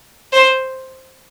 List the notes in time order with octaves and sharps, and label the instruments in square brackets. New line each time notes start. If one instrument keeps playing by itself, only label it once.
[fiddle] C5